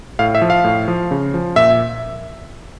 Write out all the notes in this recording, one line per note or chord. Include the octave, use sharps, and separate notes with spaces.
A2 F5
E5
F3
F5
A2
F3
C#3
F3
A#2 E5